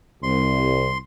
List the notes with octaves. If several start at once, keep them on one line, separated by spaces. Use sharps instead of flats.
C2 C6